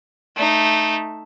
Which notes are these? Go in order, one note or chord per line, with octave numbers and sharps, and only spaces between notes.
A3 D#4